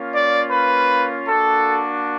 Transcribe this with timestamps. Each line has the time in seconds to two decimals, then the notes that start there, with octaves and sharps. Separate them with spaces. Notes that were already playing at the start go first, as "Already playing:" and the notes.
Already playing: A#3 C#4 F4
0.14 D5
0.52 B4
1.29 A#3 D4 F#4 A4